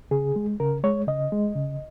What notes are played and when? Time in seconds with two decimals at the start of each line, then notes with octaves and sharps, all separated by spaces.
0.11 C#3 G#4
0.36 G#3
0.60 C#3 A#4
0.84 G#3 C#5
1.08 C#3 D#5
1.32 G#3
1.56 C#3